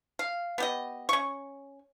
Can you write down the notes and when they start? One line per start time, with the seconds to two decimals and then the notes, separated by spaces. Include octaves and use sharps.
0.19 F5
0.58 B3 G4 D#5
1.09 C#4 C#6